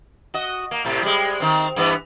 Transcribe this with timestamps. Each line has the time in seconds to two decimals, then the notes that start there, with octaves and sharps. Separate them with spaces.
0.34 F#4 D#5
0.71 A#3
0.85 A2 C3
1.02 G3 G#3
1.40 D#3 C4
1.76 G2 E3 B3